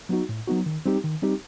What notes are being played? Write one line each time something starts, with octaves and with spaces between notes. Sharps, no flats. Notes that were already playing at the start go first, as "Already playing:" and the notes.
F#3 B3 D#4 F#4
A2
F#3 B3 D#4 F#4
D#3
G3 C4 D#4 G4
D#3
G3 C4 D#4 G4